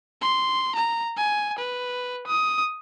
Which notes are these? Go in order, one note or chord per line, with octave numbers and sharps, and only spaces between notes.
C6
A#5
G#5
B4
D#6